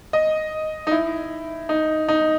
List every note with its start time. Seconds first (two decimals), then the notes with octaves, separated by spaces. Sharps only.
0.13 D#5
0.87 D#4
0.91 E4
1.69 D#4
2.08 D#4